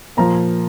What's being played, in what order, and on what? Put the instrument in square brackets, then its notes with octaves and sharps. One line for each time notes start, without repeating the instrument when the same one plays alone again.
[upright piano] A#2 F3 A#5